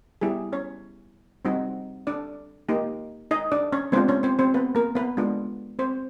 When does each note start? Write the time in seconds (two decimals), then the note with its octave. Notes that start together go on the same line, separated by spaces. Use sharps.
0.21 G3 B3 E4 G4 G#4
0.52 C#4 C#5
1.45 G3 C4 D#4 F#4
2.07 D4 D5
2.69 A#3 D#4 G4
3.31 D#4 D#5
3.52 D4 D5
3.72 C#4 C#5
3.92 G#3 B3 C4 D4 F4 C5
4.08 C#4 C#5
4.23 C4 C5
4.39 C4 C5
4.54 B3 B4
4.75 A#3 A#4
4.95 B3 B4
5.17 G#3 B3 D4 F4
5.79 C4 C5